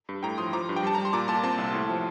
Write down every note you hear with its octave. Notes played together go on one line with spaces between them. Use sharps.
G2
A2 G5 A#5
F3 C6 D#6
F3 A#5 D6
G2
G5
G3 A5
G3 A#5
C6
A#2 A#5 D6
A#2 A5 C6
C4 A5 C6
C2
A2
F3